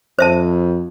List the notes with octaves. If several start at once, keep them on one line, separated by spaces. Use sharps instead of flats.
F2 C5 E5 A5